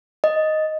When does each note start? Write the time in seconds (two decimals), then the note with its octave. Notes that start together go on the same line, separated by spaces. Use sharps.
0.24 D#5